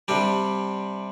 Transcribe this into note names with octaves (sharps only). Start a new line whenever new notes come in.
C3 G3 D4 G4